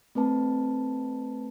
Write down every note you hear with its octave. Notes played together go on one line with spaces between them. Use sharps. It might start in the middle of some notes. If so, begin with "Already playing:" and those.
A3 C4 B4 A5